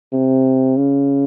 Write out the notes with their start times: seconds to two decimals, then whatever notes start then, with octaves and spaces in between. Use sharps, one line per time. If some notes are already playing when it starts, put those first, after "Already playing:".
0.13 C3
0.77 C#3